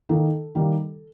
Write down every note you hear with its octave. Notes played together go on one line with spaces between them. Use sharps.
D#3 A#3 D#4 A4
D#3 G3 A#3